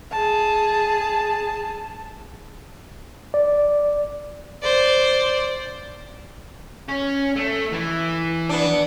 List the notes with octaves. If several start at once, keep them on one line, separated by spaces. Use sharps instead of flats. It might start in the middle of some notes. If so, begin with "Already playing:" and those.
G#4 A5
D5
C5 D5
C#4
A3
E3
B3 D4